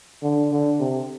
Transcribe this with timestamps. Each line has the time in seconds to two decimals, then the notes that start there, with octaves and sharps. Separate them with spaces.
0.23 D3
0.51 D3
0.80 C3